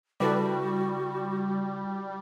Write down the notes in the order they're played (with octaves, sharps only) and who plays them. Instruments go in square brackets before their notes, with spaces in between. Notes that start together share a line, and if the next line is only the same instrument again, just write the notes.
[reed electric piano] C#3 E4 [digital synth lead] G3 [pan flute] F#4 [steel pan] A4 B4 D5